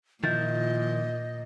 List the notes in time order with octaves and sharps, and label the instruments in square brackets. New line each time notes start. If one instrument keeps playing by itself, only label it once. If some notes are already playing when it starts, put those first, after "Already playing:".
[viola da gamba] A#2 [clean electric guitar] D#3 F3 E4 [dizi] D#5 [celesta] G6 A6